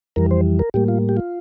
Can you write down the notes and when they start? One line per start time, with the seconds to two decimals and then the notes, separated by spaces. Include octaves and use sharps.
0.16 F2 E3 G3 A#4
0.31 C5
0.59 A#4
0.74 A2 G3 A#3 G4
0.88 F4
1.09 G4
1.17 F4